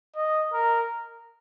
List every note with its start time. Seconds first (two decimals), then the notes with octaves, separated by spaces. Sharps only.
0.16 D#5
0.53 A#4